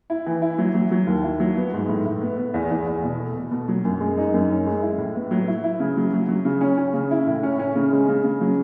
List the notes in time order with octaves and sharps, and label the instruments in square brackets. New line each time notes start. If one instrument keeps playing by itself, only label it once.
[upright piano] E4
E3
E4
F#3
F#3
F#3
D#2
E4
F#3
B3
G#2
A2
A2
B3
B3
E2
E2
E2
B2
A3
B2
B2
F#3
F#2
G#3
D#4
F#2
C#4
G#3
E4
A2
B3
F#3
E4
E4
C#3
F#3
F#3
F#3
C#3
C#4
C#4
C#3
E4
A2
C#4
C#4
C#3
G#3
C#3
C#3
F#3